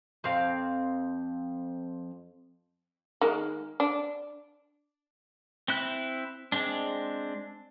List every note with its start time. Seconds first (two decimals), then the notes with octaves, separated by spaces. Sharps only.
0.24 F2 C4 F5
3.21 D#3 G#3 A#3
3.80 D4
5.68 C4 E4 F#6
6.52 G#3 C4 D4